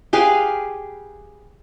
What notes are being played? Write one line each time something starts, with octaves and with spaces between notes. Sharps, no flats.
G4 G#4 B4 F5